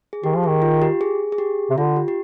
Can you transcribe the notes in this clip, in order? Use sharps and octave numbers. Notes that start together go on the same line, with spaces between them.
G#4
D#3 G4
F3
G#4
D#3
F4
G4
G#4
G#4
G4
C3
D3 F4
G4
G4